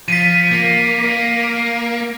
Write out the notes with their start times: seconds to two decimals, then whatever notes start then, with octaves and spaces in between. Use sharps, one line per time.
0.08 F3 B6 D#7
0.51 A#3
1.05 A#3